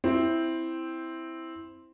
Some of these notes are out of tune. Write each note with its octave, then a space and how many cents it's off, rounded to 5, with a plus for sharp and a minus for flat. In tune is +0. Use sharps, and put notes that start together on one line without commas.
C4 +0 E4 +0